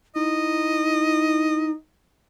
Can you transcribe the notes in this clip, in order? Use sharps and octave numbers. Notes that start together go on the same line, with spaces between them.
D#4 E4 D#5